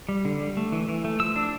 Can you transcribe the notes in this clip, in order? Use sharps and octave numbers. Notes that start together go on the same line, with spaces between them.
G3
D3
G3
A3
E3
E3
A3
F3 E6
D4